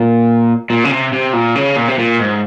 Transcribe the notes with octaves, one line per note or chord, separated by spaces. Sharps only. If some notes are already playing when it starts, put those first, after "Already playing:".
Already playing: A#2
A#2
C#3
C3
C3
A#2
C#3
A#2
C3
A#2
G#2